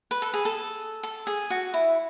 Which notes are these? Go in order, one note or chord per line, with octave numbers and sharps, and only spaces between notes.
B4
A4
G#4
A4
A4
G#4
F#4
E4